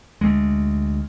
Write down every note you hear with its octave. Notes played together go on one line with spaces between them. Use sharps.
D2 G#3